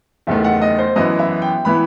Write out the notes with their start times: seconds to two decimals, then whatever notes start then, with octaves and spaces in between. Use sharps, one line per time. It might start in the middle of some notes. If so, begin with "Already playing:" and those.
0.27 F#1 E2 D#3 A3 E5
0.44 F#5
0.61 D#5
0.78 C5
0.96 F#2 E3 B3 E4 D#5
1.19 E5
1.42 G5
1.65 E3 B3 E4 B5